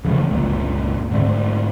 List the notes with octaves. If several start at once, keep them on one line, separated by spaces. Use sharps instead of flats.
C#3 E3 F3 A3
G1 C#2 A#2
G#2 D3 A3 C4